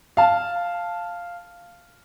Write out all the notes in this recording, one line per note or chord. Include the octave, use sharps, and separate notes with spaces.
F5 A5